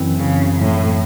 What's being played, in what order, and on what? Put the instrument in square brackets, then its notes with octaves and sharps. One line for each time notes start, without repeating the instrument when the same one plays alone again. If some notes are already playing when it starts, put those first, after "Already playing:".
Already playing: [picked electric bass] F#1 F#2 E3 C4
[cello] C#3
A2